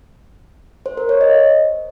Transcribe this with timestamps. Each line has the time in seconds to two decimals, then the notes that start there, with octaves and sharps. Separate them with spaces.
0.86 C5
0.97 A#4
1.09 C#5
1.21 D#5